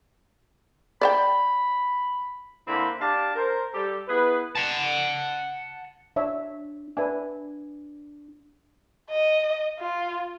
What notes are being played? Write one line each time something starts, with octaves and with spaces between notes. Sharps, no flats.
D5 E5 G5 B5
D3 A#3 C4 E4 C5 B5
D4 G4 F5 A5
A#4 C5
G3 G4 A4
B3 E4 G#4 B4
F#5 A5
D4 C#5 E5
D4 B4 E5 G#5
D#5
F4